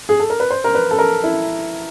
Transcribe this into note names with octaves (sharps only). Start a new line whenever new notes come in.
G#4
A4
A#4
B4
C5
A#4
B4
A4
A#4
E4